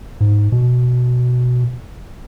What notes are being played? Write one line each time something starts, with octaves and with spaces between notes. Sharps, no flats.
G#2
B2